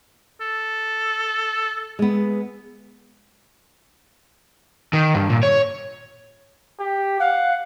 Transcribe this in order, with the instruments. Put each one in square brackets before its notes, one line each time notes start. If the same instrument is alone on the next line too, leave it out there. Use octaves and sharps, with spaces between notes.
[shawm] A4
[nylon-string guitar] G#3 B3
[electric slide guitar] D#3
G2
A#2
C#5
[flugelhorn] G4
[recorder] F5 [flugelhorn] F#5